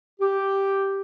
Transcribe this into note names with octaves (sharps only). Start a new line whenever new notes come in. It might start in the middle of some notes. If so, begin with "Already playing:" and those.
G4